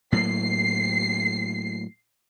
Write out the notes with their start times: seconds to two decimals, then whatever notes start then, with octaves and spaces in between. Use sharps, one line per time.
0.12 A2 F#3 A#3 C7